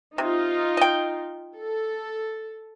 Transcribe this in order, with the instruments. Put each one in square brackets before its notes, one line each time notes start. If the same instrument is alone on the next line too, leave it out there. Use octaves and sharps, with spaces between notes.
[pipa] C3 [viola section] D#4 F4
[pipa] D#5 G5
[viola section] A4